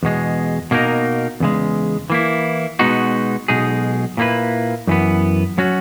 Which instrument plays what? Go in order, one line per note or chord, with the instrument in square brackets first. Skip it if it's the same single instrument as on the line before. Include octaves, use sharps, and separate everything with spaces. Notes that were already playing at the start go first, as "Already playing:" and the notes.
[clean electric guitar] E2 B2 G#3
B2 A#3 D#4 A#4
E2 C#3 G#3
E3 A#3 E4
B2 G#3 B3 D#4 F#4
B1 B2 G#3 D#4 G#4
A#2 A#3 E4 B4
F#2 E3 B3
F#3 C#4 F#4